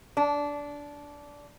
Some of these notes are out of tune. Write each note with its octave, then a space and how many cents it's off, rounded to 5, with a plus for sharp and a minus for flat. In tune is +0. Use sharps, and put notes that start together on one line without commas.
D4 -15